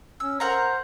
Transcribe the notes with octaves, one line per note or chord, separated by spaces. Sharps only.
C#4 E6
A#4 C5 F#5 A#5